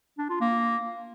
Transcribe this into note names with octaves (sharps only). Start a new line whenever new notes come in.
D4
F4
A#3